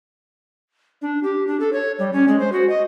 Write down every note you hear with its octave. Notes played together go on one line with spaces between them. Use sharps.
D4
G4
D4
A4
C#5
G3
C#4
G#3
C5
F#4
D#5